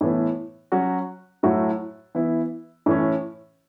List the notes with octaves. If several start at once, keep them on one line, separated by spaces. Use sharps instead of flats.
A2 E3 B3
F#3 C#4 F#4
A2 F#3 A3 F#4
E3 B3 E4
A2 E3 C#4